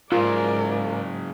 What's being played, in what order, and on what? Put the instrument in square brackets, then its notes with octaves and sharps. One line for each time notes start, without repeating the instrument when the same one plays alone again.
[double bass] G#2 [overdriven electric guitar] C#3 F#3 [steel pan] F4 [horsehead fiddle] A#4 D5